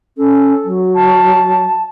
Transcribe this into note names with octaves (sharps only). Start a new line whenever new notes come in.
C#4 A4
F#3
A5